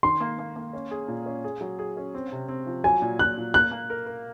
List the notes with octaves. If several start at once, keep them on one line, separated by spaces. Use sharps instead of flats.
D#3 C6
A#3
A#3
A#3
C#4
G#4
A#2
C#4
G#4
F#3
G#4
C#4
C4
C3
C4
F3
F#3 G#5
A#2
A#2 F#6
A#2
A#3 F#6
A#3
A#4
A#4